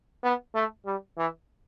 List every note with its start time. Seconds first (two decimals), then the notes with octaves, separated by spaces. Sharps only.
0.24 B3
0.55 A3
0.86 G3
1.17 E3